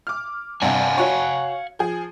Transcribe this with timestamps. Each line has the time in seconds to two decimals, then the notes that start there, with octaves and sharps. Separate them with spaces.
0.07 D6 F6
0.62 G2 C3 F5 F#5 G#5
0.98 F#4 C#5
1.79 F3 G#4